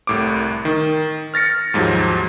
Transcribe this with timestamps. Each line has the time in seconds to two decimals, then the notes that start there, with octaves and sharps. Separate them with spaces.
0.07 C2 A2 D6
0.65 D#3
1.34 F6 A6 A#6 C#7
1.74 D#2 G#2 F3 F#3